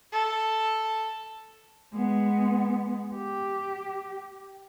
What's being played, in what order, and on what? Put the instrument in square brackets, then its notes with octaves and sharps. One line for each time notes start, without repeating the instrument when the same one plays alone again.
[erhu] A4
[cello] G#3 B3
G4